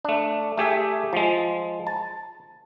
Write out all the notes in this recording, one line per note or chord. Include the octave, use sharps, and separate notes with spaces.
A3 D4
A3 G4 G#4 E5
F3 G#3
A5